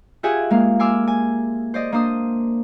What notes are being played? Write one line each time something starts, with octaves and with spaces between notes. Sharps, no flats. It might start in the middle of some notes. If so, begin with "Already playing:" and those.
F4 G4 G#4 E5 F#5 G#5
G#3 A#3 F5
G#5 C6 D6 E6 F6
G#5
C5 D5 D#5
A#3 D4 C5 C6 D#6